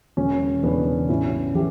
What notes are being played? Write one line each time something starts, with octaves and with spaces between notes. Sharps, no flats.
E1 C#4
E2 C#3 E3 B3 D4
A1 C#4 E4
E3 G4